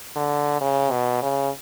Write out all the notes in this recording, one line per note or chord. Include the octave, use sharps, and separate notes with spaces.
D3
C#3
B2
C#3